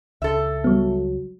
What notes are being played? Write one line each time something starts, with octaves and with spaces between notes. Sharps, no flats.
C#2 A4 E5
F#3 G3 B3